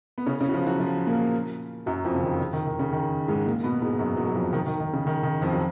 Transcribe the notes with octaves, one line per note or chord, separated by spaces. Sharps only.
B3
C#3 C#4
C#3 C#4
F#4
F3 F4
F#3 F#4
F3 F4
A#2 A#3
F#2 F#3
F2 F3
C#3
D#3
C#3
D#3
D#3
C#3
D#3
G#2 G#3
A#2 A#3
B2 B3
G#2 G#3
F#2 F#3
F#2 F#3
F#3
F2 F3
D#3
D#3
D#3
C#3
D#3
D#3
F2 F3
F#3